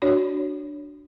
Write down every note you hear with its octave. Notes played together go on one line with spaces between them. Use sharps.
D4 F#4 C#5 D5 B5